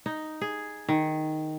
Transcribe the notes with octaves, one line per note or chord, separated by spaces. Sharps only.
D#4
G#4
D#3